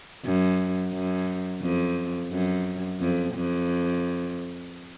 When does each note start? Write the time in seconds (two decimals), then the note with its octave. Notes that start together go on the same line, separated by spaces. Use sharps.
0.25 F#2
0.93 F#2
1.62 F2
2.32 F#2
3.00 F2
3.34 F2